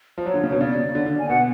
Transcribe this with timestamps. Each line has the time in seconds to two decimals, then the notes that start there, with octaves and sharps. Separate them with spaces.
0.18 F3
0.26 F#3 C#5
0.34 D3
0.43 C#3
0.50 B2 C#5
0.61 C#3 D5
0.95 D3
1.06 D3
1.19 G#5
1.29 B2 F#5